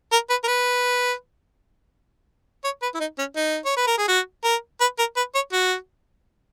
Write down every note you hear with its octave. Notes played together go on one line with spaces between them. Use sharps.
A#4
B4
A#4
B4
C#5
B4
E4
D#4
C#4
D#4
C#5
B4
A#4
G#4
F#4
A#4
B4
A#4
B4
C#5
F#4